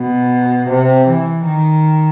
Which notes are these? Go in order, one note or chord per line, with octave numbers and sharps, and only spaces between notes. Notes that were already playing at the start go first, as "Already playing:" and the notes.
Already playing: B2
C3
E3
D#3